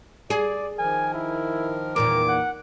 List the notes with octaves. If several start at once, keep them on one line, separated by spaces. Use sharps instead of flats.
G#4 D5
D#3 F3 A#4 G#5
E4
E2 A#2 D#3 A#4 D6
F#5